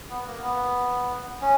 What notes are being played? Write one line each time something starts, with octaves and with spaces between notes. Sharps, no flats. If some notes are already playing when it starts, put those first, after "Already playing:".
B3
A#3
B3
C#4